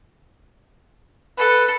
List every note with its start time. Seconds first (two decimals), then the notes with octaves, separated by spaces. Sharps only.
1.38 A4 B4